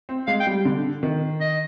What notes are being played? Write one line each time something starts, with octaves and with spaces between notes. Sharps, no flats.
C4
G#3 F5
G5
G3
D3
D#3
D#5